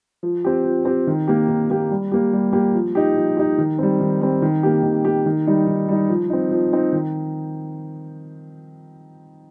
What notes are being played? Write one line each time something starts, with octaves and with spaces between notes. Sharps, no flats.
F3
C4 G4
F3
C4 G4
D#3
A#3 G4
D#3
A#3 G4
G3
A#3 G4
G3
A#3 G4
F3
D#4 G4
F3
D#4 G4
D#3
G3 C4
D#3
G3 C4
D#3
A#3 G4
D#3
A#3 G4
D#3
G3 D#4
D#3
G3 D#4
F3
C4 D#4
F3
C4 D#4
D#3